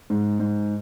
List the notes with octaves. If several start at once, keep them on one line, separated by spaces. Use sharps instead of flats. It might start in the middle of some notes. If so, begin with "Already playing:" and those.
G#2
G#2